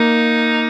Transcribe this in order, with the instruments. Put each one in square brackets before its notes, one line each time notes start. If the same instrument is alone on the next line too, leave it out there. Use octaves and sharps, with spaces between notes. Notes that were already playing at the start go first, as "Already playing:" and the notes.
Already playing: [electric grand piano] A#3 [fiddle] D#4